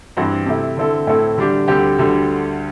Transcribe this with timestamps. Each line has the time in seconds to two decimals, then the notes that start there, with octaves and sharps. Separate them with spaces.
0.17 G2 E3 C4 G4
0.46 C3 A3 E4
0.77 D3 C4 E4 A4
1.07 A2 A3 C4 E4 A4
1.37 D3 G3 D4 G4
1.68 D2 D3 G3 C4 G4
1.99 D2 D3 G3